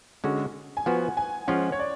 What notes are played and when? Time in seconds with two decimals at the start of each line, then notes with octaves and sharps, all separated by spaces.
0.24 D3 G#3 C#4 F#4
0.77 G#5
0.86 F3 B3 F#4 F#5
1.17 G#5
1.48 F3 G#3 C#4 F4 F#5
1.72 C#5
1.80 D5